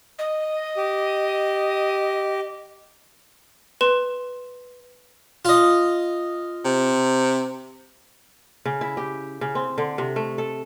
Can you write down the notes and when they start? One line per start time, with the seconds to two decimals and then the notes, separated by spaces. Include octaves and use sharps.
0.18 D#5
0.77 G4
3.81 B4 C6 E7
5.45 F4 D#5
6.65 C3
8.65 C#3
8.81 E4
8.97 G4
9.41 C#3
9.55 C4
9.78 D3
9.98 C3
10.16 A3
10.38 A4